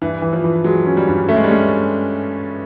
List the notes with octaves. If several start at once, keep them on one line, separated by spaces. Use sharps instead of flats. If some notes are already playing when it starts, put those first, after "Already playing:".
G2 E3
E3
F3
E3
F#3 G#3
C#4
G3
G2
A3 C#4
G#3
G3
G#3 C#4